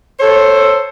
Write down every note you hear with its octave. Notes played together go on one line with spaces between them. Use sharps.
A4 C5 C#5